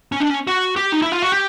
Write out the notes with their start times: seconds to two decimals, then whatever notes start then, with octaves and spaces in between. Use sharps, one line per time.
0.12 C#4
0.20 D4
0.30 C#4
0.47 F#4
0.76 G4
0.92 D#4
1.02 E4
1.12 F4
1.22 F#4
1.32 G4